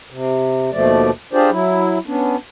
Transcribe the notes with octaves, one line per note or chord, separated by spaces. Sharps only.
C3
D#2 B2 F3 A3 D5
D4 F4 G4 G#4 C5 D5
F#3 E4
B3 C#4 D4